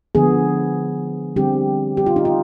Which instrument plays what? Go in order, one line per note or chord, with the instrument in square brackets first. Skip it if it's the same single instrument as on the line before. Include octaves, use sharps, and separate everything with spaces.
[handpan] D3 F3 B3 G#4
D3 G3 C4 G4
G4
F4
D#4
F4